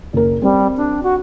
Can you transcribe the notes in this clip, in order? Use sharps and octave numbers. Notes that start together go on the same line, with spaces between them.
F#1 A#4
G3 C4
D4
F#4